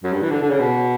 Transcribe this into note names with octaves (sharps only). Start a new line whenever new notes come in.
F#2
G2
E3
D3
D3
C#3
B2